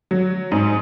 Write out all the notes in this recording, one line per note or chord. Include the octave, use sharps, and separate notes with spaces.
F#3
G#2